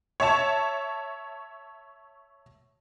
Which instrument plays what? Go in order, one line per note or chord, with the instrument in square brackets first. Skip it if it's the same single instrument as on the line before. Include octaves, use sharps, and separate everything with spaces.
[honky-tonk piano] C#5 E5 A5 C#6